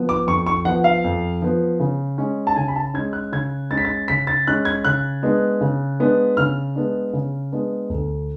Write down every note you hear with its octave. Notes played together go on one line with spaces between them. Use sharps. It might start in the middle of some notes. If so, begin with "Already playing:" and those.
Already playing: F3 B3
D6
F2 C#6
C#6
F3 B3 F#5
F5
F2
F3 B3
C#3
G#3 C#4
A5
C#3 G#5
B5
A5
G#3 C#4 G#6
F#6
C#3 G#6
G#3 C#4 A6
B6
A6
C#3 B6
A6
G#3 C#4 F#6
G#6
C#3 F#6
G#3 B3 D4
C#3
G#3 B3 D4
C#3 F6
G#3 B3 D4
C#3
G#3 B3 D4
D2